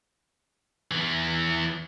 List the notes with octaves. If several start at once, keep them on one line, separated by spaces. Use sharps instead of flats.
E2 E3